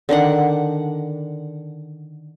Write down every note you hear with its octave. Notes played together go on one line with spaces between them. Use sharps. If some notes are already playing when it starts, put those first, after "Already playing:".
D3 D#3 D4 F#5